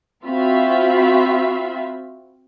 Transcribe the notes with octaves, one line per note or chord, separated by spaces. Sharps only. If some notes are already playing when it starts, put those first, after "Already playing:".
C4 F4 F#4 E5 F5 B5